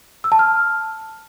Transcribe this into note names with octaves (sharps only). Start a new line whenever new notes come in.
E6
A5
F6